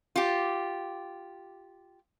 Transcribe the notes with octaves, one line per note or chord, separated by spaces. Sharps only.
F4 G4